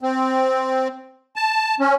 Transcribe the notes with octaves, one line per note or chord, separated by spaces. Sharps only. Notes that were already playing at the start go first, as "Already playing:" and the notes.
C4
A5
C#4